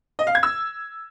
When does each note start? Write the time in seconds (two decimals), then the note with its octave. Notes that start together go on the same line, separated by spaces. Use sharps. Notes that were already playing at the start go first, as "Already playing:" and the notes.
0.19 D#5
0.27 F5
0.35 G#6
0.43 E6